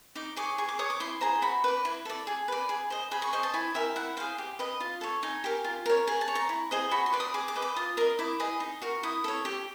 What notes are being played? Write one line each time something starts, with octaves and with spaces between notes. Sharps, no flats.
D#4 D6
G#4 C#5 D6
G#4 C#6
D6
C#5 D#6
D6
E4 C6
G#4 C5 A#5
F#4 B5
B4 D5
E4
A4 D5
G#4
B4 D5
G#4
C5 D#5
G#4 B5
C#6
C5 D#5 C#6
A5
E4 G#5
G4 A#4 E5
E4 F#5
G#4 C5 F5
G4
B4 D#5
F4
A4 C#5
D#4 G#5
G4 A#4
F4
A#4 C#5
G#4 G#5
A5
C#5
A#5
E4
G#4 C5 D#5
F#4 B5
C6
B4 D5
D#6
G#4 D6
D6
B4 D#5
D6
F4 D#6
A#4 D#5 D#6
E4 D6
G#4 B4 D#5
D#4
F#4 A#4
E4 D#6
A4 C#5
G4